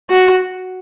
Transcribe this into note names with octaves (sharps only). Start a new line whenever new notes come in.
F#4